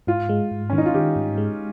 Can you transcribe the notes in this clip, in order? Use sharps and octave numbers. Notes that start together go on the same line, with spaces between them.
G#2 F4
G#3
G#2
C#4
D#3
D#4
F4
D#3 G4
G#2
G#3